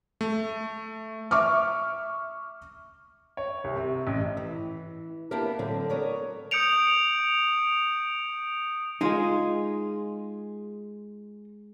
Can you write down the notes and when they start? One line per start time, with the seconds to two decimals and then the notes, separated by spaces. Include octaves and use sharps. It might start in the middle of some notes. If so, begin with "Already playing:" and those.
0.21 A3
1.31 E5 C#6 D6 F6
3.37 C#5
3.64 C2
3.76 C3
4.07 A1
4.37 E3
5.31 A#3 B3 D4 E4 G4 A#4
5.59 A2 D3 F#3 C4
5.89 B3 A#4 C#5 D5
6.51 D#6 G6 C#7 D7 F7
9.01 G#3 D#4 F4 G#4